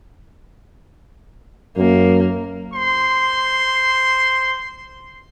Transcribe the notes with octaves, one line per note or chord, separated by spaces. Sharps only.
F#2 A#3
C5 C6